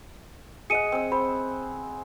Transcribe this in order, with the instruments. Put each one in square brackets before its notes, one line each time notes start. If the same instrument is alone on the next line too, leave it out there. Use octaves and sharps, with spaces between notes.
[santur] G#4 D#5 F#5 [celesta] C#7 D#7
[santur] C4 E6
[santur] C5 [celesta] B5